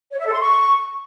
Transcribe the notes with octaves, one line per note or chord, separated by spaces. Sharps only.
C#5
E5
A4
C6
C#6